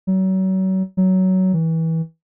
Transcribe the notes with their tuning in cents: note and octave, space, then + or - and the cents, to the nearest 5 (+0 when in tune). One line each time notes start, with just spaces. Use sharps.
F#3 +35
F#3 +15
E3 -25